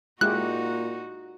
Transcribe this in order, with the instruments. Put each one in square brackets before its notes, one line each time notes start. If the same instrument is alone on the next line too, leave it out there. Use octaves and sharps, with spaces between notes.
[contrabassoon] A#2 [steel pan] G#3 E4 G4 [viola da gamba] D#4 F#4 [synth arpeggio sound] F#6